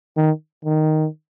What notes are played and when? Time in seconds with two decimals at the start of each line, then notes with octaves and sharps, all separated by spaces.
0.17 D#3
0.65 D#3